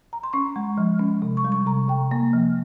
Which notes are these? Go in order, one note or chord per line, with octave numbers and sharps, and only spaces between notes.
A#5
C6
C#4 C#6
G#3
F3
C#4
C3
C#6
G3
C#6
C3 A#5
C3 G5
A#3
F3